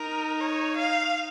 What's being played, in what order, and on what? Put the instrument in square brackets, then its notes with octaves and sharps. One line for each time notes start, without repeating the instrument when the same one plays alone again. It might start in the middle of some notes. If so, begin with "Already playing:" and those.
Already playing: [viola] D#4 [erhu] A#4
[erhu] C#5
F5